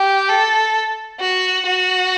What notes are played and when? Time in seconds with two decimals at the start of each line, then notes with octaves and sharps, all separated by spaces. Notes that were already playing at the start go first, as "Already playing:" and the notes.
Already playing: G4
0.29 A4
1.20 F#4
1.66 F#4